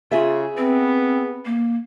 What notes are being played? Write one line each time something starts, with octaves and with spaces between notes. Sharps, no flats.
C#3 F4 G#4 E5
B3 C4
A#3